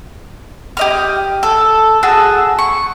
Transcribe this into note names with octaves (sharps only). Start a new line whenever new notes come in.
G4 D#5 F6
A4
F#4 G#4 A5 E6
C#6